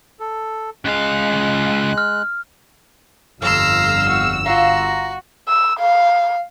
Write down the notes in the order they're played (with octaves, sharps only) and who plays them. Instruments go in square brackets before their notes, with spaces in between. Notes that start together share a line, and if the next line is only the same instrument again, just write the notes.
[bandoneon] A4
[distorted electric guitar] C#2 F5 [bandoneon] G#3 F#6
[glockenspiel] F6
[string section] G1 E6 [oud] F2 [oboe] F5 [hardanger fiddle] A#5 C6
[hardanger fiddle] F#4
[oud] F4 F5 [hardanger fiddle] F#4 [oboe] A#5
[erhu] E6
F5